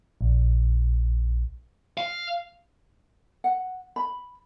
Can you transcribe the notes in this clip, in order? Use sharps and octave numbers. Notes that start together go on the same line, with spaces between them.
A#1
F5
F#5
B5